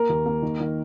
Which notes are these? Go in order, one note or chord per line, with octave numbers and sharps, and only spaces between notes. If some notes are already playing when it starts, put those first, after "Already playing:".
Already playing: A#3 A#4
D#2
A#3
D#3
D#3